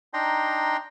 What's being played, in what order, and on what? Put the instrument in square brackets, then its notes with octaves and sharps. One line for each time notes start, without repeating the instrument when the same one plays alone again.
[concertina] D4 D#4 G5 A#5 C6